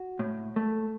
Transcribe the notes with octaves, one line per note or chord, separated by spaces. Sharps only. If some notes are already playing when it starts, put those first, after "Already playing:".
Already playing: F#4
A2
A3